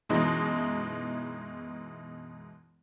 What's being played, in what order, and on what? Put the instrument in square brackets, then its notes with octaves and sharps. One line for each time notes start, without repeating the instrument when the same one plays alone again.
[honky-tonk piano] F#2 B2 E3 G#3 D#4